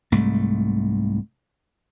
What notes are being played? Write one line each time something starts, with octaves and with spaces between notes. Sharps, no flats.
C2 G#2 A3